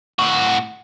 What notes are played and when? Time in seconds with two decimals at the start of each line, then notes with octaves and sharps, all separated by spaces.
0.19 A2 F#4